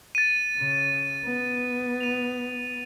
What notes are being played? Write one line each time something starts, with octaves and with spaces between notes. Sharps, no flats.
A6 D#7
C#3
B3
D#7 F7